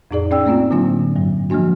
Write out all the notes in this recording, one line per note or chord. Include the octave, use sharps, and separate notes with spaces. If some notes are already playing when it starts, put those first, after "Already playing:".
F2 A2 D#4 G#4 D5
C#4 D5 G5 E6
A3 A#3 C4 D#4 F4
A2 D3 F#3 A#3 D4 F4
G2 F#3
F3 G#3 A#3 D4 F#4